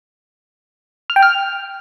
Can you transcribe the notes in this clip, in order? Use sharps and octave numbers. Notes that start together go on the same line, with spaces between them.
F6
G5
F6